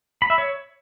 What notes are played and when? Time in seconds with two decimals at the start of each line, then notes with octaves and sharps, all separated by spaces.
0.22 B5
0.30 E5
0.38 C#5